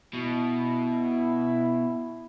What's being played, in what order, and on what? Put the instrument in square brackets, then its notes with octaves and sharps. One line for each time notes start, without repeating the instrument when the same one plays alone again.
[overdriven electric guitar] B2 [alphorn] E4